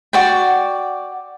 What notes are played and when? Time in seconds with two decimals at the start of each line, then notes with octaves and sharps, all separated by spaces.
0.13 F#4 D5 G5